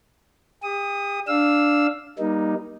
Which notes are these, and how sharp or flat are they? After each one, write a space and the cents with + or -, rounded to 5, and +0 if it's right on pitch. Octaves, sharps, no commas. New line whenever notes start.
G4 +40 D#6 +0
D4 +0 F5 +5 E6 +0
G3 +0 A#3 +30 D#4 +0